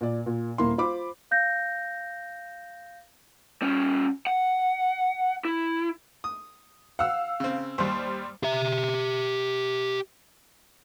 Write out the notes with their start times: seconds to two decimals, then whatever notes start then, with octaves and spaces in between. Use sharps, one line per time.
0.01 A#2 D5
0.26 A#2
0.58 D#1 A#3 E4 C6
0.78 F4 C5 B5 D6
1.31 F5 G6 A#6
3.62 G3 C#4
4.27 F#5
5.45 E4
6.24 D#6
6.99 F5 F#5 E6
7.40 C#3 C4
7.78 D#2 G3 C5
8.43 G4 E5